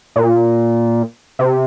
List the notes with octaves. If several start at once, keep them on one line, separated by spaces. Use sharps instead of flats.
A#2
C3